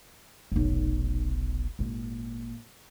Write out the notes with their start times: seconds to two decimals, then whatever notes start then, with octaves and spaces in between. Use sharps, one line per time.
0.52 F1 B1
1.79 G#1 A#2